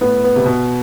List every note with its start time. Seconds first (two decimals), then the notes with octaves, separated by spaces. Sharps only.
0.01 A2 B3
0.24 B3
0.36 C3
0.46 B2 B3